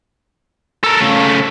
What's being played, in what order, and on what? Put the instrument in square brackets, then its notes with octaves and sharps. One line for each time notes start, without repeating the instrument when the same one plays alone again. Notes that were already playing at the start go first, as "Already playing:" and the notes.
[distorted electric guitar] A4 A#4
C#3 A3